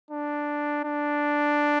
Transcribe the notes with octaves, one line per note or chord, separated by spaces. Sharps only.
D4
D4